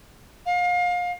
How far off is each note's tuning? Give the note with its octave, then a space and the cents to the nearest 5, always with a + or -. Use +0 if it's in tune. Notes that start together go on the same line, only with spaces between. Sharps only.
F5 +30